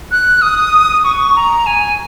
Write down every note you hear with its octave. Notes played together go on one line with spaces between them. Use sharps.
F#6
D#6
C#6
A#5
G#5